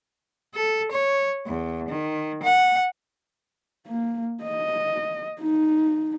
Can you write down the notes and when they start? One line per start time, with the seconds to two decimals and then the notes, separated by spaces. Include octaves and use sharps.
0.55 A4
0.91 C#5
1.47 E2
1.89 D#3
2.43 F#5
3.87 A#3
4.44 D#5
5.40 D#4